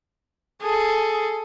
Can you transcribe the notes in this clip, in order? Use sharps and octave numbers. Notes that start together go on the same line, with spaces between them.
G#4 A4